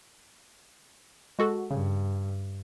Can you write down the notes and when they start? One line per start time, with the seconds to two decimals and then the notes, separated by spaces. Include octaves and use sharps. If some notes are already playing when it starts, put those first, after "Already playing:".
1.39 G#3 F#4 A4
1.71 G2 C#3